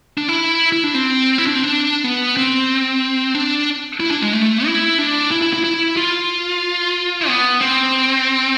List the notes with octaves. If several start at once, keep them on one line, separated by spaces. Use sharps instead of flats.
D4
E4
E4
D4
C4
E4
D4
C4
D4
B3
C4
D4
E4
D4
G#3
A3
E4
D4
E4
E4
E4
E4
F4
B3
C4